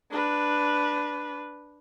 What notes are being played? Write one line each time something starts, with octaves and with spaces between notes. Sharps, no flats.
D4 B4